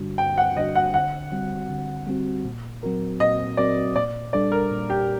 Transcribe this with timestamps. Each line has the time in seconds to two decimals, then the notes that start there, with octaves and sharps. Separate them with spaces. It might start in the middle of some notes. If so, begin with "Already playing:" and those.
Already playing: G2 D3 G3 D4 F#4
0.18 G2 G5
0.38 F#5
0.56 D3 G3 D4 F#4 D#5
0.75 F#5
0.94 D3 F#5
1.32 G3 C4 F#4
1.69 D3
2.07 G3 C4 F#4
2.45 A#2
2.83 F#3 C4 F#4 A#4
3.20 A#2 D#5
3.57 F#3 C4 F#4 A#4 D5
3.95 A#2 D5
4.33 G3 D4 A4 D5
4.52 A#4
4.71 A#2
4.90 G4